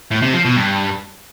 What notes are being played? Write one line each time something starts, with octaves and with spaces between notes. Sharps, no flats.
A2
C3
F3
B2
G2